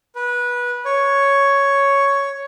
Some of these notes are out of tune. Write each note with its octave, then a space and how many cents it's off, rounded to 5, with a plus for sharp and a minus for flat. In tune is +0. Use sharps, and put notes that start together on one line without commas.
B4 -20
C#5 +5